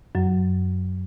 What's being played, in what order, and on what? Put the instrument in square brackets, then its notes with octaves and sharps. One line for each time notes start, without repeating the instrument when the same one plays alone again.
[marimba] F#2 F#3